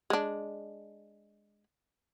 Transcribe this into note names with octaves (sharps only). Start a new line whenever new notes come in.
G#3 D4